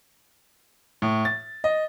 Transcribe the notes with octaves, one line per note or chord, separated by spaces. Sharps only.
A2
A6
D#5